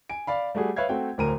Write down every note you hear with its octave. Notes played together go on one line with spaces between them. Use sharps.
G#5 D7
D5 F5 B5
G3 A3 F#4 G#4
B4 C#5 E5 F5 G#6
A3 C4 F#4 G5
D1 D2 A#4 A#5 D#7